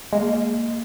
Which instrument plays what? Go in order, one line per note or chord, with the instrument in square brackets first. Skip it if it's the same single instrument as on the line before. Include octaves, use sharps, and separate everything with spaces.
[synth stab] G#3 [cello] A#3